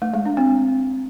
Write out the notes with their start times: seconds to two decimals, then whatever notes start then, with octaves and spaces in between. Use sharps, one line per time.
0.02 A3
0.14 G#3
0.25 D4
0.37 C4